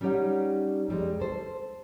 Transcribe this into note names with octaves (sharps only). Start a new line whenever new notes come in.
G3 C#4 D#4 G4 C#5 F#5
F2 G3 G#3
A4 C5